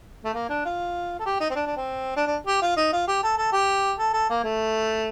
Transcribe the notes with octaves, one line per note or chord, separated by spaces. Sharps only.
A3
A#3
D4
F4
A4
G4
D#4
C4
D4
D4
C4
D4
D4
G4
F4
D#4
F4
G4
A4
A4
G4
A4
A4
A#3
A3